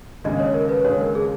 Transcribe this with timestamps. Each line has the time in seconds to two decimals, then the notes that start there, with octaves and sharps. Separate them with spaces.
0.24 D#2 C#3 G#3 D#5
0.39 C#5
0.54 A#4
0.69 B4
0.84 D#2 C#3 G#3 C#5
1.00 A#4
1.15 G#4